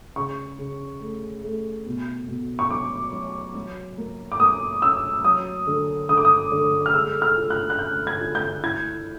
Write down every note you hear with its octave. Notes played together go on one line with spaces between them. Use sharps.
C#3 C#6
C#3
A3
A3
B2
B2
C#6
F#3 D6
F#3
F#3
A#3
D6
A#3 D#6
C#4 E6
F#3 D#6
D3
D3 D#6
D6
D#6
D3
F6
G#3 E6
F6
F4
F#6
F#6
C#4 G6
G#6
F4
G6
E4 G#6